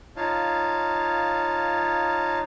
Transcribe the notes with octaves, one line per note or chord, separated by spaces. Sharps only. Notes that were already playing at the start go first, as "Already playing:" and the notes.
D#4 F4 C#5 F5 A5